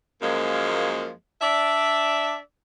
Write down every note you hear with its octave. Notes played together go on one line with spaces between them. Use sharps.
F#2 F3 G#3 A#3
D4 D5 E5